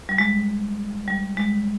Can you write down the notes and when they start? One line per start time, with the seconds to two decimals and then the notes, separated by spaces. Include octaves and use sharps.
0.09 G3
0.18 G#3
1.08 G3
1.37 G#3